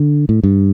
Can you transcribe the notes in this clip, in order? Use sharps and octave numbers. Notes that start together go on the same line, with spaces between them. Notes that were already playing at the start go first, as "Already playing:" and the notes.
Already playing: D3
A2
G2